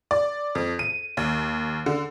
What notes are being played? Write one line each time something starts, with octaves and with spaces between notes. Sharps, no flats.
D5
F2
D#7
D#2
D3